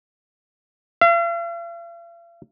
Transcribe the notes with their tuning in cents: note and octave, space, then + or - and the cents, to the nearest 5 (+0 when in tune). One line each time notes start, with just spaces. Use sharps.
F5 -45